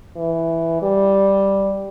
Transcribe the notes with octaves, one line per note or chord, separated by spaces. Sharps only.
E3
G3